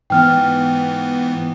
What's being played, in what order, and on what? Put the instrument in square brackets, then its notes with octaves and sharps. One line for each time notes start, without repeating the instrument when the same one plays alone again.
[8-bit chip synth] G#2 E3 B3 [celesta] G5 F6